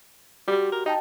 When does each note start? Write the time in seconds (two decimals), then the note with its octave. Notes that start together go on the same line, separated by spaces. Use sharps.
0.48 G3 F#4 G4
0.72 A#4
0.86 D#4 D#5 G5 A5